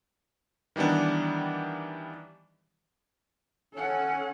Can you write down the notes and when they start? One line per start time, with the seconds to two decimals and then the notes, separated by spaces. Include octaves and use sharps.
0.76 D#3 E3 G3 B3 D4
3.73 C#4 A4 F#5